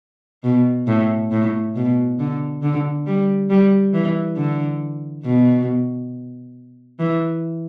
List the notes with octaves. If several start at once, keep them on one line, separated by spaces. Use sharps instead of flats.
B2
A2
A2
B2
D3
D3
G3
G3
E3
D3
B2
E3